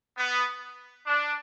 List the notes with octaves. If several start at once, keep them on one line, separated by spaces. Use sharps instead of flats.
B3
D4